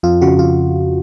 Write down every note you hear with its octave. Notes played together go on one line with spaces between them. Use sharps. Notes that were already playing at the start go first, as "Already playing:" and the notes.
F2 F4
C#3 F#4
F2 F4